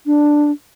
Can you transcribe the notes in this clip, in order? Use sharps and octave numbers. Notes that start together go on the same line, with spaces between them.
D4